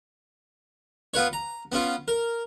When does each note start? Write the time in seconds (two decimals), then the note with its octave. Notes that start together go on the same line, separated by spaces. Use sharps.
1.14 B3 F4 B4 C#5
1.33 A#5
1.72 B3 C#4 F4
2.08 A#4